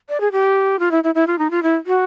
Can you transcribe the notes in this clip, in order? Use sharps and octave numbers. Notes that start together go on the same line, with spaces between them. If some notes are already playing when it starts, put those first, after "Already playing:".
D5
G#4
G4
F4
E4
E4
E4
F4
D#4
F4
E4
F#4